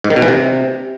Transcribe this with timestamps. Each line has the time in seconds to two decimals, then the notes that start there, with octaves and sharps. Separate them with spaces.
0.04 G#2
0.10 D#3
0.16 B2
0.22 E3
0.28 C3